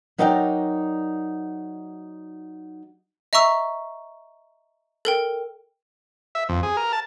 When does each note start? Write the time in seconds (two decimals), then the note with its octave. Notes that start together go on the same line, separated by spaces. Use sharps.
0.18 F#3 D#4 A#4 D5 F#5 G5
3.33 D#5 E5 A#5 C#6 E6
5.05 A4 A#4 G5
6.35 E5
6.49 F2
6.63 G#4
6.77 A#4
6.93 A5